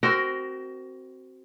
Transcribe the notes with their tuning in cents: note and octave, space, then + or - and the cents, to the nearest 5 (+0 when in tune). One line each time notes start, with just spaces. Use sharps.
C4 +0 F#4 +25 A#4 +0